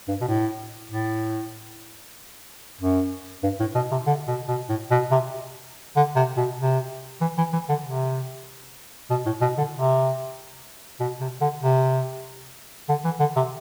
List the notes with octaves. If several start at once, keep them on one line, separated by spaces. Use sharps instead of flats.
G2
B2
A2
A2
F#2
G2
A2
B2
C3
D3
B2
B2
A2
B2
C3
D3
C3
B2
C3
E3
E3
E3
D3
C3
B2
A2
B2
D3
C3
B2
C3
D3
C3
D3
E3
D3
C3